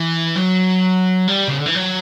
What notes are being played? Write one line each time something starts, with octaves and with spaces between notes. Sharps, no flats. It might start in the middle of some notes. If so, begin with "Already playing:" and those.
Already playing: E3
F#3
G3
C#3
D3
E3
F#3